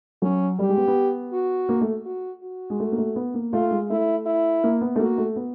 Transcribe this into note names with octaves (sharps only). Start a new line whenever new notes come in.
F#3 C#4
G3 G4
G#3
B3
B3
F#4
A#3
A3
F#4
F#4
G#3
A3
A#3
A3
B3
A#3
A3 F4
G#3
A3 E4
E4
A#3
B3
A3
A#3 F#4
A3
B3